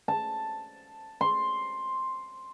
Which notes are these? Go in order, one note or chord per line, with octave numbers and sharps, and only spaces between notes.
A5
C6